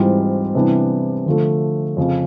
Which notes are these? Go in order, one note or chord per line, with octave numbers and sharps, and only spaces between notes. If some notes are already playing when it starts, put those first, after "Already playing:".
Already playing: G#2 E3 G3 C4 F4
C3 E3 G3 B3 D4
D3 F3 A3
F2 C#3 F3